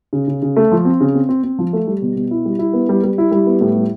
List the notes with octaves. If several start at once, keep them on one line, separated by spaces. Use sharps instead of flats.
C#3
C#3
C#3
A3
F3
C4
C#3
C4
C4
C4
F3
A3
G3
B2
B2
E4
G3
E4
B3
G3
G3
E4
G3
B3
A2
G3